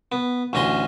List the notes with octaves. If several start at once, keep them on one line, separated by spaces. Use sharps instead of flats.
B3
A1 D2 C#4 A#5 C6